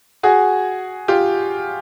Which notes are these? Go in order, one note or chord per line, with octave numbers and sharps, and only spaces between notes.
F#4 G#4
F4 G4